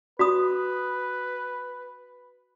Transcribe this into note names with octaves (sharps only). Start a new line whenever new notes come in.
F#4 B4 B5 D#6